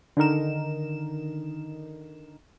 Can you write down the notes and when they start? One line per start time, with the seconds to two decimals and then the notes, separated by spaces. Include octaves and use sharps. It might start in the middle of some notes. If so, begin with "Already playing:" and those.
0.17 D3 D#3 D#4 A#4 E7